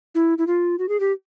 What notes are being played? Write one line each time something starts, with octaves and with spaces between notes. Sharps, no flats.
E4
E4
F4
F#4
G#4
G4